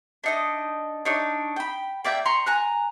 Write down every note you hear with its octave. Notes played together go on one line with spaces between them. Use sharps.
D4 D#4 D#5
D4 D#4 C#5
G5 B5
A#3 D5 E5 G5
A#5 C6 C#6
G#5 A#5 F#6